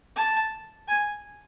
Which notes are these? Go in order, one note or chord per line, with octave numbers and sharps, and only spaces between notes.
A5
G#5